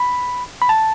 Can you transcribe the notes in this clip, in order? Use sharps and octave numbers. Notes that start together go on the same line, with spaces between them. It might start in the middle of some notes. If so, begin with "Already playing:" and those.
Already playing: B5
B5
A5